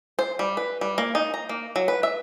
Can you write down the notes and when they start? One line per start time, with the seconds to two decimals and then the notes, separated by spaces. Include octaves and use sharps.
0.19 C5
0.39 G3
0.57 B4
0.81 G3
0.98 A#3
1.15 D#4
1.34 A#5
1.49 A#3
1.76 F#3
1.88 B4
2.03 E5